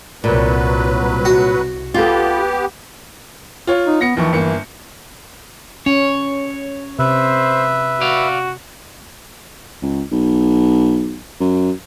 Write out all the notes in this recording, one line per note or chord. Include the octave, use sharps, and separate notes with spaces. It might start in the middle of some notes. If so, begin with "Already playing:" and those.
C2 A#2 F#3 B4
F#4
B3 F4 G4 A4
F4 C#5
D#4
B3 A#6 C#7
D#2 E3 F3 C#6
G1 A#3 C#7
C#4 C#5
C3 B4 C5 E5
F#4 D5 F5
C#2
B1
F#2